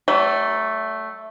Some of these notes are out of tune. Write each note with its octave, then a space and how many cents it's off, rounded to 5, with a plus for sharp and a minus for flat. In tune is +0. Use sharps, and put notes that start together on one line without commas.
F#3 +45 A3 +0